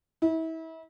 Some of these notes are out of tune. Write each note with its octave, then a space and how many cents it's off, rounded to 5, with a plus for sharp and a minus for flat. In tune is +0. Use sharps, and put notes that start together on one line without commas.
E4 -35